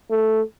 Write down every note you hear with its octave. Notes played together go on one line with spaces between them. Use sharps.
A3